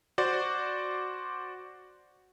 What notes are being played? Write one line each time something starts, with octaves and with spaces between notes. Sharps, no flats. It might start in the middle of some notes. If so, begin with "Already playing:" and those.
F#4 C5 D5 C6